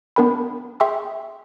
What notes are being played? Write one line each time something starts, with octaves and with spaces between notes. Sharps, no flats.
B3 D4 A#4 G5 B5
G#4 E5 G5 C6 C#6 E6